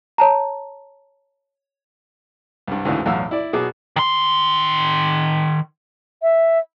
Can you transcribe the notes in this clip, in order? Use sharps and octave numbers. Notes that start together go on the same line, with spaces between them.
C#5 A5 A#5
C2 G2
D2 G#2 C#3 E3
B1 E2 A2 F#4 F5 E6
E4 D5
B2 F#3 G#4 D6
D#3 C6
E5